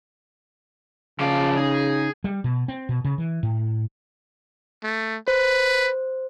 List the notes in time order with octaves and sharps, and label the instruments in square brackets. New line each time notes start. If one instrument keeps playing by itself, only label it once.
[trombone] C#3 [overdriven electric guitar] F3 D5 [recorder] F5
[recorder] D#4 [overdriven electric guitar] G#4
[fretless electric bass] G3
B2
C4
B2
C#3
E3
A2
[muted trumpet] A3
[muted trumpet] B4 [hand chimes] C5